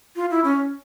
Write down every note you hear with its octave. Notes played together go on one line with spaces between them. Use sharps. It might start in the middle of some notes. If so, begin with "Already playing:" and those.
F4
E4
C#4